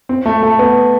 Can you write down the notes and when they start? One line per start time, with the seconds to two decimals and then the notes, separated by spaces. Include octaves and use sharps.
0.09 C4
0.26 A3
0.43 A3
0.59 B3